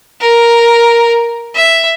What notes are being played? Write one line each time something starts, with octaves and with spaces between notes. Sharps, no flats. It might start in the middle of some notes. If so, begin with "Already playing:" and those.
A#4
E5